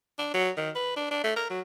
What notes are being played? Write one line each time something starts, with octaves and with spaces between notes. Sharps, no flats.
D4
F#3
D#3
B4
D4
D4
A3
A#4
F#3